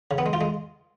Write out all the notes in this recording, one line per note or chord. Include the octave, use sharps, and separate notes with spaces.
C#3
B3
G#3
F4
G#3